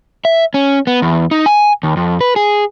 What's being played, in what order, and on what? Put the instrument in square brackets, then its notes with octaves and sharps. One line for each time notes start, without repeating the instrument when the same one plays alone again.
[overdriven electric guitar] E5
C#4
B3
E2
D#4
G#5
D#2
F2
B4
G#4